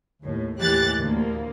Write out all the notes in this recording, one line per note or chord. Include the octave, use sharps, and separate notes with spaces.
D#2 A2
D#2 A2 E3 G4 F#6 A6
D2 A#3